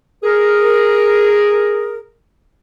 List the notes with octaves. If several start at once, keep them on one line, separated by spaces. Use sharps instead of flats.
G#4 A#4